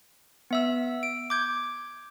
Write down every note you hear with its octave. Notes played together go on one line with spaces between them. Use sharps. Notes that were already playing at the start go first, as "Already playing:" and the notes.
B3 E5 E6
D7
D6 G6 G#6